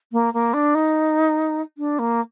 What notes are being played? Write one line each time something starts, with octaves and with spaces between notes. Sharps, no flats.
A#3
A#3
D4
D#4
D4
A#3